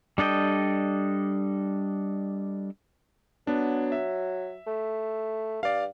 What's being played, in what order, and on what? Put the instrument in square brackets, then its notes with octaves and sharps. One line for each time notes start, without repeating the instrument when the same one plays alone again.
[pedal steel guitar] G3 D4 A4 D#5 G5
[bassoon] F#3 [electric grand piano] B3 D4
[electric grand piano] E5
[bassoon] A3
[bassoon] G2 [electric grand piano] D5 F5